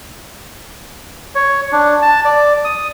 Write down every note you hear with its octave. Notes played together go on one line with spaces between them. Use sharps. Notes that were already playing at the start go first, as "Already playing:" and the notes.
C#5
D4
A5
D5
D#6